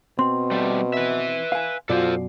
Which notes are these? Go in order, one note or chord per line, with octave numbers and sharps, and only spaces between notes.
B2 C4 C6
G3 A3
B4 E5
F5 G#5
F#2 B2 F4 A4 B4 C5 D5